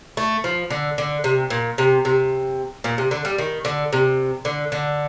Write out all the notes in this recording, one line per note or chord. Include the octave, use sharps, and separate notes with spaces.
A3
F3
D3
D3
C3
A#2
C3
C3
A#2
C3
D3
G3
D#3
D3
C3
D3
D3